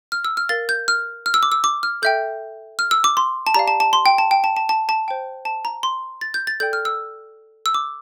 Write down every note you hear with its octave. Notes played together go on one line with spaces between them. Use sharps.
F6
E6
F6
A#4 F5 A6
G6
F6
F6
E6
D6
E6
D6
F6
A4 E5 G5 G6
F6
E6
D6
C6
A5
G4 D5 F5 A#5
A5
A5
C6
G5
A5
G5
A5
A5
A5
A5
C5 G5
A5
A#5
C6
A6
G6
A6
A4 D5 G5 G6
F6
E6
E6
D6